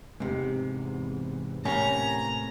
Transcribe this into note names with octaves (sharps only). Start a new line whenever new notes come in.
E2 G#2 C3
A2 C3 A#3 C#4 A#5